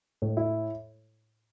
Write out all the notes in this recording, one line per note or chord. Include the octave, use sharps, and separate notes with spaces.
A2
E4